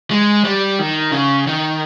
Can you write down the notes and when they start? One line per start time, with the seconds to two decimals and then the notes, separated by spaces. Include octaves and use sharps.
0.11 G#3
0.45 G3
0.79 D#3
1.12 C#3
1.47 D#3